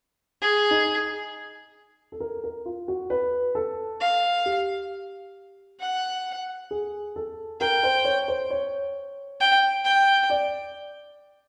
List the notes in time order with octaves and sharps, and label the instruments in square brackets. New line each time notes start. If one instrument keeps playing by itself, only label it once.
[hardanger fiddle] G#4
[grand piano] D#4
A4
A#4
A#4
F4
F#4
B4
A4
[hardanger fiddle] F5
[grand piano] G4
[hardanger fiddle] F#5
[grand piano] G#4
A4
[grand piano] A#4 [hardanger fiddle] G5
[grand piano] C5
C#5
C5
C#5
[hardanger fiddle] G5
G5
[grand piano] D5